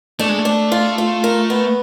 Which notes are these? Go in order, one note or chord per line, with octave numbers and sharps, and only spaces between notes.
A3 D4
G#3
A3
D4
F4
F4
A#4
B3